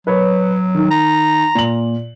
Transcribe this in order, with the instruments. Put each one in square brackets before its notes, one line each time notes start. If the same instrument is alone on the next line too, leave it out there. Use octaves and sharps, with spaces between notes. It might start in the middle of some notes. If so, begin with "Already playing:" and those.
[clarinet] F#3 [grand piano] B4 C#5
[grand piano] D#3
[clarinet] A#5
[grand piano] A#2 F#7